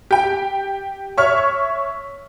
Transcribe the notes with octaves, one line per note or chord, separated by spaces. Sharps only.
G4 G5
C#5 E5 C#6 F6